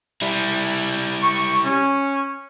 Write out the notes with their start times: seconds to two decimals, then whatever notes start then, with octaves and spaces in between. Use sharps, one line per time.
0.22 G3 E4
1.22 C#6
1.65 C#4